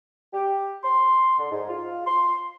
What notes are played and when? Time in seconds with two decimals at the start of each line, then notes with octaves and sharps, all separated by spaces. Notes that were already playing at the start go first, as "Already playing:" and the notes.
0.33 G4
0.84 C6
1.38 D3
1.51 G#2
1.69 F4
2.07 C6